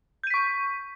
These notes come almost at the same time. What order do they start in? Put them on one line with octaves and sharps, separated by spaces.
G6 D#7 B6 C#6